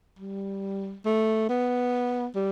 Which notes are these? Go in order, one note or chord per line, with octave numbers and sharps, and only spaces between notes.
G3
A3
B3
G3